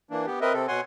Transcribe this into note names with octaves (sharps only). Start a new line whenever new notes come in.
E3 A#3 D4
B3 G4
C4 A#4 B4 D#5 E5
C3 C4 A4
B2 C#5 F#5 G#5 C6